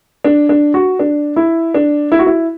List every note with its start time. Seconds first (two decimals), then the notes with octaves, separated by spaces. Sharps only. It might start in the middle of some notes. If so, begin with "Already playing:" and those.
0.24 D4
0.49 D4
0.74 F#4
0.99 D4
1.36 E4
1.74 D4
2.12 E4
2.19 F#4
2.26 E4